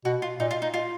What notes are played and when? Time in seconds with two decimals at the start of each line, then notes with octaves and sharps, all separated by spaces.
0.05 B2 F#4
0.22 F4
0.40 A#2 D#4
0.51 F4
0.62 D#4
0.74 F4